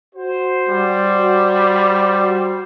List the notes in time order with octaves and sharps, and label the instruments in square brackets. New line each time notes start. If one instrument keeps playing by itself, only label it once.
[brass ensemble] F#4 C5
[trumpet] G3